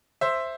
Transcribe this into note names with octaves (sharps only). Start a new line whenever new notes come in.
C5 E5